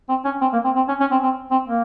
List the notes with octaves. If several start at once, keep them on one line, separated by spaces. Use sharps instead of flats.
C4
C#4
C4
A#3
C4
C4
C#4
C#4
C4
C4
C4
A#3